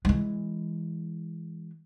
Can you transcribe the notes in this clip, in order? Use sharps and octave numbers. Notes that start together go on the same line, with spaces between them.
E3 G#3